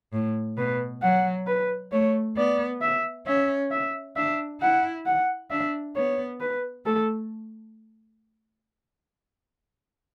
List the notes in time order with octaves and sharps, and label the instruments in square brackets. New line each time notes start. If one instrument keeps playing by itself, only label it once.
[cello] A2
[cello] B2 [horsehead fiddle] B4
[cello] F#3 [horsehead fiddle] F#5
[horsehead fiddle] B4
[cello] A3 [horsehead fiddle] C#5
[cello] B3 [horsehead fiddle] D5
[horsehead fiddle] E5
[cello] C#4 [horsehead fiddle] E5
[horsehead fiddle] E5
[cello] D4 [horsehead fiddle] E5
[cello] E4 [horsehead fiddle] F#5
[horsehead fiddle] F#5
[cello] D4 [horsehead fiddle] E5
[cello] B3 [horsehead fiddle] C#5
[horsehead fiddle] B4
[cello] A3 [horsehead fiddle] A4